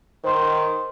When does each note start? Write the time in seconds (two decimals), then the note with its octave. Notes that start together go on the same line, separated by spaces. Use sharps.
0.24 D#3 C5 C6